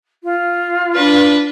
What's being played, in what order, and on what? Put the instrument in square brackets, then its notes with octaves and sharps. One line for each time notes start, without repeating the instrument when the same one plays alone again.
[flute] F4
[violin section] D4 B4